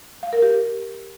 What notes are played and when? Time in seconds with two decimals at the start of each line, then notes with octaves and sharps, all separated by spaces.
0.23 F5
0.33 A#4
0.42 G4